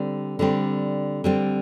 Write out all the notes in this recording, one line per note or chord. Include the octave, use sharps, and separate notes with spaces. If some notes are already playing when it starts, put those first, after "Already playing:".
Already playing: D3 G3 C4
D3 G3 C4
D3 G3 C4